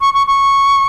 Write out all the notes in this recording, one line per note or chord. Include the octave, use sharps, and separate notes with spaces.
C#6
C#6
C#6